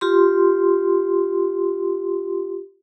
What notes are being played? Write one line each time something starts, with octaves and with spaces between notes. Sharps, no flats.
F4 G4 C6